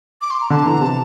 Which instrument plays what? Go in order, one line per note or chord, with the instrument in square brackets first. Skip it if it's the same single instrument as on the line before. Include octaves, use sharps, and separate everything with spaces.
[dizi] D6
C6
A#5
[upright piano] D3 [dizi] A5
[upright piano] E3 [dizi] A#5
[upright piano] C3 [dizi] A5